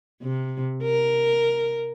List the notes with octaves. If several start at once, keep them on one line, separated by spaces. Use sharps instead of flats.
C3
A#4